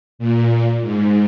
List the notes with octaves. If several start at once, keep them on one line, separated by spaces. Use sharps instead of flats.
A#2
G#2